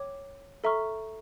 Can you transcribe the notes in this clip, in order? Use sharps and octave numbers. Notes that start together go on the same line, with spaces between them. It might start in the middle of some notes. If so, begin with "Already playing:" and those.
Already playing: C#5 G5 D6
A4 E5 A#5 C#6 F6